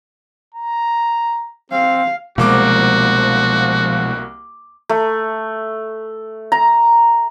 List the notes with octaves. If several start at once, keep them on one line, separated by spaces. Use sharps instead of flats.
A#5
C4 F5
C2 B2 F3 G#3 A#3 F#4 D6
A3
A#5